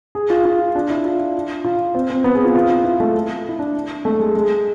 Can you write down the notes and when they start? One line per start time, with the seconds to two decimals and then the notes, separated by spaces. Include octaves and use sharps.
0.15 G#4
0.30 F4
0.45 F4
0.75 D4
0.90 E4
1.05 F4
1.65 F4
1.95 C4
2.10 C4
2.24 B3
2.35 G#4
2.45 F4
2.55 F4
2.70 F4
2.84 E4
3.00 A3
3.49 E4
3.59 D4
4.05 A3
4.20 G#3
4.35 G#3